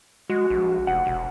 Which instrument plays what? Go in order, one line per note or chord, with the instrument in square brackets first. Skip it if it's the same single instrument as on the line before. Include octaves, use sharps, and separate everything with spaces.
[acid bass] G#3 [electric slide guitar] F#4
[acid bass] A#1
[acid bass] F1 [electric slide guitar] F#5
[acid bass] E1